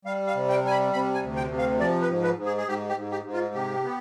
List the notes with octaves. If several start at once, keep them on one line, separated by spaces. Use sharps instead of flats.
G3 F5
F5
C3
G5
G3 G#5
B5
C3 B5
G#5
D2
G5
C3
F5
F3 D5
B4
G#2
B4
G#2
G#4
G#4
G#2 G4
G4
G#2
G4
G#2
F4
C3 G4
B3